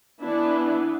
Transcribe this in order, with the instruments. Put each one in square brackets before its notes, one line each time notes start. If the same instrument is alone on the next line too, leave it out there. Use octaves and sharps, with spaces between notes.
[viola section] E3 B3 D4 E4